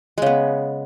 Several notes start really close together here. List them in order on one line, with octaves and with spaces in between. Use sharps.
G#3 C#3 B3